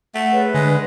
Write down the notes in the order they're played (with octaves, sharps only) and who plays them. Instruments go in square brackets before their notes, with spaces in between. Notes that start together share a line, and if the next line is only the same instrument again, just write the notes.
[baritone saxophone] A3 [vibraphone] F#5
[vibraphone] G#4 C#5 [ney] B4
[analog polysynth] D3 [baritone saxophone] G#3